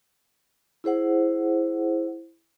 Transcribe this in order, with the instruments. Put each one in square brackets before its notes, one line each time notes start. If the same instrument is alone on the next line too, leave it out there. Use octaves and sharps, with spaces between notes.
[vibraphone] E4 G#4 C5 F#5